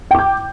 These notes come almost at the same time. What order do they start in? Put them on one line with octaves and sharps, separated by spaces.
G5 D6 G6